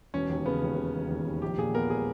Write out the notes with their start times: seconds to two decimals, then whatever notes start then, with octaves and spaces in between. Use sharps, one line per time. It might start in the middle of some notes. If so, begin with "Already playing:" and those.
0.14 E1 C#4
0.29 D#2
0.45 C#3 B3
0.63 D#2
0.78 C#3
0.94 E1
1.10 D#2
1.26 D#2
1.42 A#1 G4
1.58 A#2 G#4
1.75 B3 A#4
1.90 G#3 G#4